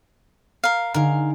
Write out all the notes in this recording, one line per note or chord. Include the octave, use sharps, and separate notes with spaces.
A#4 F5
D3 D#4 G#4 A#4 F5